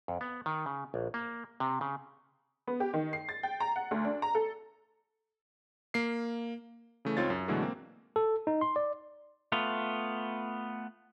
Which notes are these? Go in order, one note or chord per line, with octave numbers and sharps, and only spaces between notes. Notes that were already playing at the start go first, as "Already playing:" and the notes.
F2
B3
D#3
C#3
A#1
A#3
C3
C#3
B3
G4
D#3
C7
A6
G5
A#5
F#5
D2
D4
A#5
A4
A#3 C7
C#3 E3 A3
C#2 C4 D#4 F4 C#5 A6
F#2
B2 D3 E3 F#3 G#3 A3
A#3 C4
A4
D#4
C6
D5
A3 B3 F4